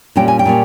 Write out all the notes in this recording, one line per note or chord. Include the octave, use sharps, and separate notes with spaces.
A#2 G3 C#4 G5
G#5
G5
A#2 G3 C#4